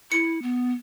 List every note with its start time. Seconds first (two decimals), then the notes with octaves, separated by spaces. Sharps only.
0.12 E4 C#7
0.42 B3